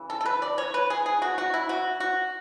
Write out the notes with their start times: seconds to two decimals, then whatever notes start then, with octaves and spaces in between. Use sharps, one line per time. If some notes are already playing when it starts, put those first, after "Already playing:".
Already playing: C#3 E3
0.10 A4
0.21 A4
0.26 B4
0.42 D5
0.58 C#5
0.74 B4
0.90 G#4
1.06 G#4
1.22 F#4
1.38 F#4
1.54 E4
1.69 F#4
2.00 F#4